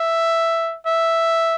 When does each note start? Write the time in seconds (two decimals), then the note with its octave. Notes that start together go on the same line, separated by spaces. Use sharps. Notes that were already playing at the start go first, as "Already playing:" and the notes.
Already playing: E5
0.86 E5